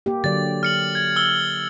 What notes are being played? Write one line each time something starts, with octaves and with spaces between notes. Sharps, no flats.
A#3 G4
D3 F#3 D5 A6
F6 C#7 F#7
G#6 F#7
E6 F#7 G7